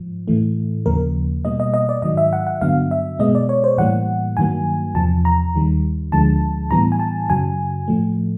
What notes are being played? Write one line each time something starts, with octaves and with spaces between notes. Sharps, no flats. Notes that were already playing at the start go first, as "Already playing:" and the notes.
Already playing: G#2 F3
A2 E3 A3
D#2 C#3 F3 A#3 A#4
B2 G3 A#3 D#5
D#5
D#5
D5
G#2 D#3 F#3 D#5
E5
F#5
F#5
G2 D3 F#3 B3 F5
E5
B2 G#3 B3 D#5
D5
C#5
C5
A2 E3 G3 A#3 F#5
G2 D#3 F#3 A#3 G#5
E2 C3 F3 A5
A#5
D#2 D#3 G3
D2 D3 F3 G#3 A5
A2 E3 G3 B3 A#5
G#5
A5
F#2 C#3 F#3 G#5
A2 F3 A3